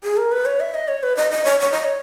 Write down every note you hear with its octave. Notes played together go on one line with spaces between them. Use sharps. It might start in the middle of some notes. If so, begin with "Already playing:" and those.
G#4
A#4
B4
C#5
E5
D#5
C#5
B4
D#5
D#5
C#5
C#5
D#5
C#5